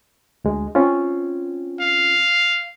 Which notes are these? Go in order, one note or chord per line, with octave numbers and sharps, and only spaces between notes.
D2 G#3
C4 C#4 F4
F5